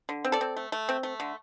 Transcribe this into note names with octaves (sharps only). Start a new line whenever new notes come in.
D3
C4
A4 D5
C4
A3
A3
C4
A3
D3